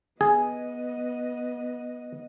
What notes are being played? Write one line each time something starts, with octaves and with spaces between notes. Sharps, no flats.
B3 G#4 D#5